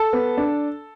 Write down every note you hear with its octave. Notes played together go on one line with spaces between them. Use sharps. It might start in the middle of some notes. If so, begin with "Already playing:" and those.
Already playing: A4 A5
B3
D4